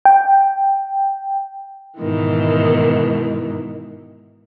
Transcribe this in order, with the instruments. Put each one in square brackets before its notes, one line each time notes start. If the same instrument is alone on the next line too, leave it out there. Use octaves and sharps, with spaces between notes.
[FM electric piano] G5
[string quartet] G#2 B2 D#3 E3